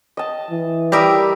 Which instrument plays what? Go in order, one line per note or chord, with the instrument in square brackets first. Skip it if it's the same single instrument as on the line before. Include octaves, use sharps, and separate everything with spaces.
[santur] D#5 A5
[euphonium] E3
[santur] G3 D#6 [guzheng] G4 A#4 E5